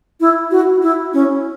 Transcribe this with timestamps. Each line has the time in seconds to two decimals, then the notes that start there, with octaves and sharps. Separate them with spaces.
0.20 E4
0.51 F#4
0.82 E4
1.14 C#4